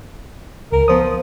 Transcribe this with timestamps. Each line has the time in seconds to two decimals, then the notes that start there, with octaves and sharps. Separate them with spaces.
0.72 C#2 A#4
0.88 F3 B3 C5 D#6